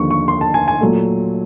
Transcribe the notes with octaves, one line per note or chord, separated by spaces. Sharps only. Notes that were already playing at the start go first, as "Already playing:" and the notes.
Already playing: D#2 D3 F3 C#6
C#6
C6
A5
G#5
G#5
A#2 F#3 A3